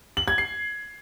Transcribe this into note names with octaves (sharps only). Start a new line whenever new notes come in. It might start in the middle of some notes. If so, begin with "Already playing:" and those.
F#7
G#6
C7